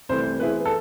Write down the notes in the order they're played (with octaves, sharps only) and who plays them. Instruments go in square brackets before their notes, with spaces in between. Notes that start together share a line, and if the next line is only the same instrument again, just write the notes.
[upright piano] C2 C3 E3 A3 [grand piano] C5
[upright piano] E3 B3 E4 G#4 [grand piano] B4
[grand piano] A4